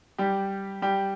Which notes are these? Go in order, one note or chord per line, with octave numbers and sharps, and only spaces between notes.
G3 G4
G3 G4